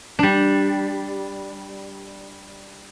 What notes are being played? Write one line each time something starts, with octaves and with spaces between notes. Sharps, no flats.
G3 D4